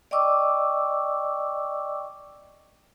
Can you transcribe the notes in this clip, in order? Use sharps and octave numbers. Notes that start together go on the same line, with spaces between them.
D5 D#5 G5 C#6 D6 E6